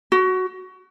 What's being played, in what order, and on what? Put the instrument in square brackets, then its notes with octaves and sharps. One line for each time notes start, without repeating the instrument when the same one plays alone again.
[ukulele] F#4